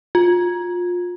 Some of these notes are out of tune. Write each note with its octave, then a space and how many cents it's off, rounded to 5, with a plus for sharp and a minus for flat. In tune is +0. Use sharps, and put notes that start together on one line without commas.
F4 +25